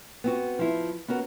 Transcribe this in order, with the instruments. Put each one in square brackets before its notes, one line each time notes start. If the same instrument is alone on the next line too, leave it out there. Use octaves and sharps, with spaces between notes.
[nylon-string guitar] B3 C4 F#4
F3 E4
B3 C#4 F#4 A#4